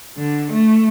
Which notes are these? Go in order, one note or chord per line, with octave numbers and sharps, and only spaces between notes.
D3
A3